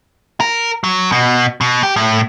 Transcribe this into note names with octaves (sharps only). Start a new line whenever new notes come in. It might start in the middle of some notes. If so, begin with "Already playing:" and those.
A#4
F#3
B2
B2
G4
A2